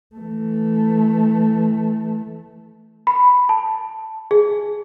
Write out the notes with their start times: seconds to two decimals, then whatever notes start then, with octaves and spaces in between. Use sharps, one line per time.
0.15 E3 A3
3.07 B5
3.49 A5
4.31 G#4